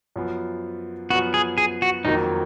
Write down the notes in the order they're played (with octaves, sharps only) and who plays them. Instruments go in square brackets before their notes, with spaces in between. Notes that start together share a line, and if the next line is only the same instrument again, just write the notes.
[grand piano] F#2 F3 B3
[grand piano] F#2 F3 B3 [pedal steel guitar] F#4
[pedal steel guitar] G#4
G#4
F#4
[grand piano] F2 D#3 F#3 A#3 [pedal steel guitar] D#4